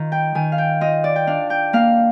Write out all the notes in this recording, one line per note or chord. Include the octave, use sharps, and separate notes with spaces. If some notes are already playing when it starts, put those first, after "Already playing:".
Already playing: D#3 F4 A#5
G5
D#3 G#5
F5
G5
F4 D#5
D5
G5
D4 F5
G5
A#3 F5